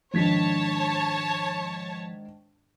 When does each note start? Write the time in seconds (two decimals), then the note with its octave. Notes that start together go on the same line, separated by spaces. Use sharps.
0.14 G#2 D#3 F3 D4 C#5 A5 G#6 B6